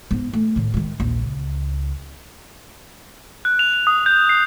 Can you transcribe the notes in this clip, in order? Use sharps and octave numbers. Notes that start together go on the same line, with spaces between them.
G#2 B3
A3
A2 D#3
D#3 G#3
A#1 D#2
C#2
F#6
F7
F7
D#6
G6
C7